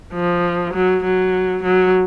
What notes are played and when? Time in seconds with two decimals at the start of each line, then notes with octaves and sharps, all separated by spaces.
0.13 F3
0.74 F#3
1.04 F#3
1.63 F#3